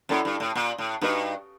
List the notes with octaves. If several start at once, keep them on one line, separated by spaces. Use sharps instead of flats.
F#2 E4 A4 D5
G2
A2
A#2
A2
G2 D#4 F#4 B4 D#5